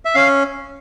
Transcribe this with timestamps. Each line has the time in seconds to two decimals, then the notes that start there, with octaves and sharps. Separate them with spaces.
0.05 E5
0.15 C#4 F5